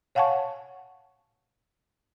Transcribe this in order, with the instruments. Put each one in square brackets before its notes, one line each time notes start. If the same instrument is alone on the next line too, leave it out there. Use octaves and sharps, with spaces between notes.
[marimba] C#5 F5 F#5 G#5 A5 C#6